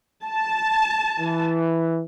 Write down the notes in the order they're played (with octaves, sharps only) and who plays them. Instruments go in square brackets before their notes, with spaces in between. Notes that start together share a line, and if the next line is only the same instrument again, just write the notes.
[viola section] A5
[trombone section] E3